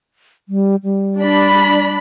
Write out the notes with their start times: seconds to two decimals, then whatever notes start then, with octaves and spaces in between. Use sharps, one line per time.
0.49 G3
0.84 G3
1.20 D4 B5